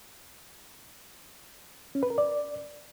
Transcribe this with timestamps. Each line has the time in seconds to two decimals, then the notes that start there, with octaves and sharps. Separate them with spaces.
1.95 C#4
2.03 B4
2.10 A#4
2.18 D5